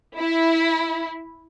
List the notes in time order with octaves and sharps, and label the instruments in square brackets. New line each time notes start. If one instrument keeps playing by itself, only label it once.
[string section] E4